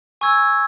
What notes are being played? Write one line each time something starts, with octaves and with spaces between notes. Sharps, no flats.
G#5 C#6 E6 G#6